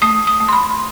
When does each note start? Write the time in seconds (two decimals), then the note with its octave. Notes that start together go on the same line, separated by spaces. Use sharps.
0.02 A3 D#6
0.27 D#6
0.41 A3
0.48 C6
0.53 B5